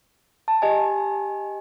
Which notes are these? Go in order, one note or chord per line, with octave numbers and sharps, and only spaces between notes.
A5
G4 D#5 G#5